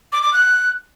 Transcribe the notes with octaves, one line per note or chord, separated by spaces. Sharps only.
D6
D6
F#6